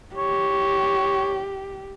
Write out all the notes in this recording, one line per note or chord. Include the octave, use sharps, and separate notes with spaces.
G4 C#5